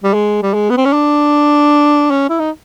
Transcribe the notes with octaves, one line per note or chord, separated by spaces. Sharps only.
G3
G#3
G3
G#3
B3
C4
C#4
D4
C#4
E4
D#4